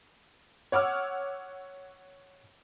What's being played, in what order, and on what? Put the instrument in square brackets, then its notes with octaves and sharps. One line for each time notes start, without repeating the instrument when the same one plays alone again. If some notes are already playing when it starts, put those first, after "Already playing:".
[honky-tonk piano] C#5 F#5 D6 E6 F6